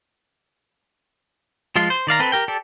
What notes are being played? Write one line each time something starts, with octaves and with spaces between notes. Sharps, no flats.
F3 G#3 F4
C5
D#3 D5 F5 A#5
C4 A4 B4
G4 A#4 G5
G4 A4 D5